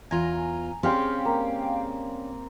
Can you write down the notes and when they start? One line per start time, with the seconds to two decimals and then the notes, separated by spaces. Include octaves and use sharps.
0.11 E2 F4 G#5 A#5
0.83 G3 C4 C#4 G4 G#4 F5 G5 C6
1.25 A#3